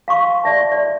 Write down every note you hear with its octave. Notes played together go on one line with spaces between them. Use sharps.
F5 C6 C#6
D5 E5 A5
D5